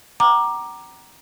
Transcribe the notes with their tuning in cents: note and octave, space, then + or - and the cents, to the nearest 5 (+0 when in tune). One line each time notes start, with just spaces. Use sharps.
F#5 +45 A#5 +10 D6 +15